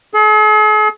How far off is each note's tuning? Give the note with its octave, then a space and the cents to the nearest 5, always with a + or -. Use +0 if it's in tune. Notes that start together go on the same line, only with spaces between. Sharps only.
G#4 +45